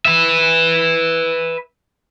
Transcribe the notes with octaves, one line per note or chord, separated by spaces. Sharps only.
B4 E5